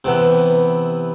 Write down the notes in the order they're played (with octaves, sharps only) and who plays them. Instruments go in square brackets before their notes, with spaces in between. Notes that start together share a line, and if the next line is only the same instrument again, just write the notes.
[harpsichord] C3 E3 B3